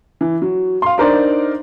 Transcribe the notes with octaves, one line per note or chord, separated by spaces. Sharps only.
E3
F#3
F5 C6
D4 D#4 A#4 C5 D5